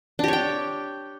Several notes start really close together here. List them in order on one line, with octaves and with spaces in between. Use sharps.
D4 G4 C#5 G5